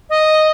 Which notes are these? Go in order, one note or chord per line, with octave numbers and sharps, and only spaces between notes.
D#5